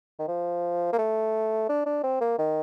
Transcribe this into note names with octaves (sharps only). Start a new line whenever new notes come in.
D#3
F3
A#3
A3
D4
D4
C4
A#3
D#3